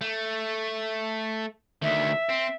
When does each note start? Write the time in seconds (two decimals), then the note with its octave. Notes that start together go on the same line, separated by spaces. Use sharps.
0.01 A3
1.82 D2 D#3 E5
2.29 C4